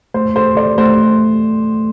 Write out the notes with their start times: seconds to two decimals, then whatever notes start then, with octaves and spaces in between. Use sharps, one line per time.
0.14 A3 C5
0.36 A4 C5
0.57 A4 D5
0.78 A3 C5